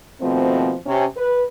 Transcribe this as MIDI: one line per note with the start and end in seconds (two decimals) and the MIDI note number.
0.21 0.74 39
0.21 0.74 47
0.21 0.74 53
0.21 0.74 57
0.21 0.74 60
0.86 1.05 48
0.86 1.05 61
1.17 1.44 71